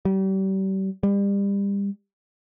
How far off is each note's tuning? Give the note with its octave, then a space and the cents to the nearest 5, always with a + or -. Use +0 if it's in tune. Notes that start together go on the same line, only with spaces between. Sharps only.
G3 -35
G3 +30